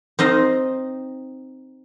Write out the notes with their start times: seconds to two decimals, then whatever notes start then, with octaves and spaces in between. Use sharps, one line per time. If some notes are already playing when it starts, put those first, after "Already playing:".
0.19 C4 D#4 D#5 F5